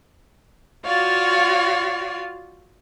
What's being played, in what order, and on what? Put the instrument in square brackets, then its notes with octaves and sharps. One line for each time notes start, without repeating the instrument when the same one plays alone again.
[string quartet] F4 F#4 C#5 D5 F5